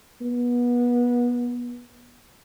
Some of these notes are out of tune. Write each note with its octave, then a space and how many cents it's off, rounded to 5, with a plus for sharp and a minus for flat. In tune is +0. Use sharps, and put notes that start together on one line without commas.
B3 -25